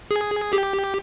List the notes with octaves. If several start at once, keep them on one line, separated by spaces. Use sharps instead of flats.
G#4
G4